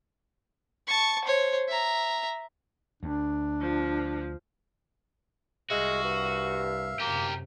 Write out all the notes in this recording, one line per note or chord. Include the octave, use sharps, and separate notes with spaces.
A5 C#6
C5 C#5
E5 A#5
D2 D4
F3
C2 G#3 F#4 E5 F5
G2
F#2 C3 A#3 G4 A#4